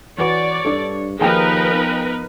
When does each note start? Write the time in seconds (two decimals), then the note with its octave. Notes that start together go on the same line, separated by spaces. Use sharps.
0.18 E3 F#4 B4 C#5 D5
0.65 G2 D4 A4
1.19 D#2 F3 D#4 G#4 A#4 B4 G5
1.74 B3